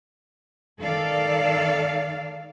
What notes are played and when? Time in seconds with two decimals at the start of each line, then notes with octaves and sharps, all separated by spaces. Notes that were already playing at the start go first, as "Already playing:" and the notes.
0.80 D#3 A4 D5 F5